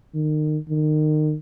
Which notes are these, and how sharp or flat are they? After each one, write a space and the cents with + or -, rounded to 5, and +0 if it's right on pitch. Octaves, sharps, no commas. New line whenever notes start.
D#3 -30
D#3 -30